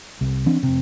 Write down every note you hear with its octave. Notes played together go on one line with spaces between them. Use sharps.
C2
E3 C4 D4
F1 C3